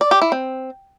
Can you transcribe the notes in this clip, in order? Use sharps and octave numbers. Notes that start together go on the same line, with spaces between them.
D5
G4
E4
C4